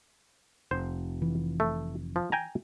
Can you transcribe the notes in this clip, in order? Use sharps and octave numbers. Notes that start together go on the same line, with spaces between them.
F1 C5
E3
A3
F3
G5 G#5 A#5